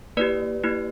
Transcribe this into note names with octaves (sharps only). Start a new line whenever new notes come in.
A#3 E4 G4 B4 D5
A#3 E4 G4